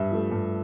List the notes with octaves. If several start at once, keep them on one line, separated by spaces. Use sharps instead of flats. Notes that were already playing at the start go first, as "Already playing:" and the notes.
Already playing: G2 E5
F3 A3
G2